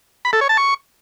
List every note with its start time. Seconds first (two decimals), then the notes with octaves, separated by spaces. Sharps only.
0.25 B5
0.33 A4
0.41 C#5
0.49 A5
0.57 C#6